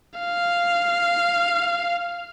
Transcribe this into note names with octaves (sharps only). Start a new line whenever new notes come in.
F5